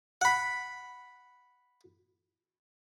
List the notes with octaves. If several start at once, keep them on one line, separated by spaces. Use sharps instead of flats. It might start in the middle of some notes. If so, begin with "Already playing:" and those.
F#5 B5